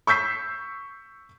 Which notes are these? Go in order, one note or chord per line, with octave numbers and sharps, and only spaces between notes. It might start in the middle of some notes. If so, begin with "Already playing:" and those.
C#6 E6 G6 B6 C7